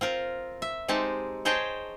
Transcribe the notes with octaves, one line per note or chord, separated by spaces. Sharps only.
C4 F4 A#4
E5
G#3 C4 D#4 G4 A5
G#4 C5 C#5 D#5 G5 A5